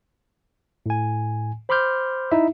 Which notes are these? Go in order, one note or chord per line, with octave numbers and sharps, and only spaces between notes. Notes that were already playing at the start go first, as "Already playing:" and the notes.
A2 G#5
C5 B5 C6 D6 F6 G6
D#4 E4 E5